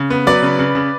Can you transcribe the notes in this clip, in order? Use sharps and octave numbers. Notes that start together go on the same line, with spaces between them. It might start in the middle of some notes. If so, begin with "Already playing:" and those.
Already playing: C#3
B3
F#3 B4 D5
C#3
C#3
C#3